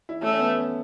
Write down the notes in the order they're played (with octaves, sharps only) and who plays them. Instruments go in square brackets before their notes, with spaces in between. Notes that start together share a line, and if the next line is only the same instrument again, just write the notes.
[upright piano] E4
[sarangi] A3 [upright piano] C#4
[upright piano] C#4
B3
C#4